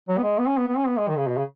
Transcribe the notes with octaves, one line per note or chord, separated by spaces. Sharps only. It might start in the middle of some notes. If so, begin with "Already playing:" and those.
F#3
B3
G#3
B3
C#4
B3
B3
C#4
B3
G#3
D#3
C#3
B2
C#3